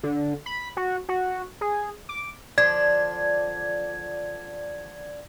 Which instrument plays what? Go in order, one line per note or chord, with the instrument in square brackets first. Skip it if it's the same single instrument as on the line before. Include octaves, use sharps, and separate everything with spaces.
[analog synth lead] D3
B5
F#4
F#4
G#4
D6
[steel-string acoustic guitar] D3 F3 D4 [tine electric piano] D5 [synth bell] G#6